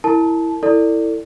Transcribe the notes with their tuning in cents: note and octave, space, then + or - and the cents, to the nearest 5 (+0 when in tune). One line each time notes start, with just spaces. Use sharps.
E4 +0 A#4 -30 A5 -20
E4 +0 A4 +30 D5 +0